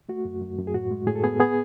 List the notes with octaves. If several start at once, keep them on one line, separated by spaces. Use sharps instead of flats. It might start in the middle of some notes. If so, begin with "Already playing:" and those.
A3 F#4
F#2
F#2
F#2
G#4
A2 F#4
G#3
A2 G#4
A4
B3 G#4
B3 G#4